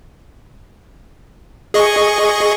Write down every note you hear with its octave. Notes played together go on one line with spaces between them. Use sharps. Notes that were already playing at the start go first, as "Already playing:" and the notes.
G#4 D#5 C#6